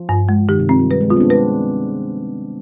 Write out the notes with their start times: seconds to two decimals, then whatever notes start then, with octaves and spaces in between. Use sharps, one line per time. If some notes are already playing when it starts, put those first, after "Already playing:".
Already playing: F3
0.09 G2
0.29 G#3
0.49 D#3 G4
0.59 C3
0.69 F3 C4
0.79 G3
0.90 G3 B4
1.01 G#3
1.10 G3 B3 F4
1.16 C4
1.20 B3 D4
1.30 G#3 B4